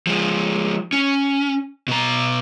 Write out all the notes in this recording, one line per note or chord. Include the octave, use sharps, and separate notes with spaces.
F3 G#3
C#4
B2 A#5